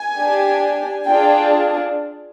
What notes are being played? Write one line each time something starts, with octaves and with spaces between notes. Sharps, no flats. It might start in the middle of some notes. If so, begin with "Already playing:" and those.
Already playing: G#5
D4 G4
D4 F4 G#4 G5